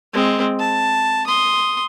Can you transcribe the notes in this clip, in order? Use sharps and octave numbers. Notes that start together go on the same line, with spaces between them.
G#3 C4
A5
C6 D#6